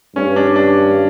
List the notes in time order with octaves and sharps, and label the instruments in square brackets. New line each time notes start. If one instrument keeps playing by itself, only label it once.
[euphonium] G2 [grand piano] C#4
[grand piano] D4
D4